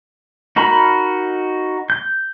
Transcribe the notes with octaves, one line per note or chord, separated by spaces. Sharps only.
D#4 F#4 A#4 A#5 B5
G6